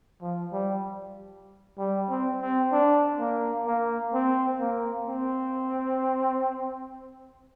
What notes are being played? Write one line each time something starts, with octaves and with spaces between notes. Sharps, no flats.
F3
G3
G3
C4
C4
D4
A#3
A#3
C4
A#3
C4